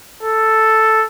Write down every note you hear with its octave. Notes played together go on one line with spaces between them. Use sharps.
A4